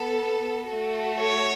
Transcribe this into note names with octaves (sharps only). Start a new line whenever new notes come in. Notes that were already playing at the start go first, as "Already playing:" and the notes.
Already playing: B3 A4
A3 F#4 A4
C#5